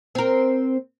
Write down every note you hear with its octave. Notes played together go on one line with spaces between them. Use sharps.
C4 A#4